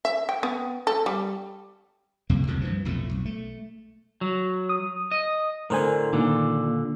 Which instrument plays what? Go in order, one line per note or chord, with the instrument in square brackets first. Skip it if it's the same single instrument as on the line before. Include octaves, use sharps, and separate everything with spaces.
[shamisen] E5
G5
B3
A4
G3
[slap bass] F2 C3 A#3
C2 A2 D#3
G2 E3 F3
B1 F2 A2 A3
B1
A3
[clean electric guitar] F#3
[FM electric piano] D#6
[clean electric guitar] D#5
[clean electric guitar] A2 D3 [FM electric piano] A#4 C5 G#5
[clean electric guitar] A#2 D3 [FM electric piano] D#3